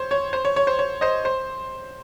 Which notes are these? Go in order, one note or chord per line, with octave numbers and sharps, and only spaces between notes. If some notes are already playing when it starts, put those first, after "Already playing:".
Already playing: C5 C#5
C#5
C5
C#5
C#5
C5
C#5
C5 D#5
C5